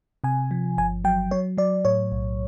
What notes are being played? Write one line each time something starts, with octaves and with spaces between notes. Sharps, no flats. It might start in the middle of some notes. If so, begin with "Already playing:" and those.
C3 G#5
F3
G1 G#5
F#3 G5
F#3 C#5
F#3 D5
A2 C#5
B1